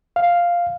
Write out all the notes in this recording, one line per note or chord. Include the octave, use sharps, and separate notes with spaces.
F5